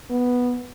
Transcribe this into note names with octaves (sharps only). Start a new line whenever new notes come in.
B3